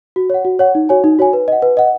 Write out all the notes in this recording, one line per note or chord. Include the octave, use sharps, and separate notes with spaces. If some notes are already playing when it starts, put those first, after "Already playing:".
F#4
C#5 F#5
F#4
C#5 F#5
D#4
F#4 C#5 G#5
D#4
F#4 C#5 G#5
B4
D#5 F#5
B4
D#5 F#5